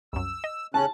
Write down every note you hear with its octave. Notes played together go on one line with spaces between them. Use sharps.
C2 F#2 E6
D#5
C#3 C#4 A5 F#6